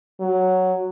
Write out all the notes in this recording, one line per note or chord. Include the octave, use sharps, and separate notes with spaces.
F#3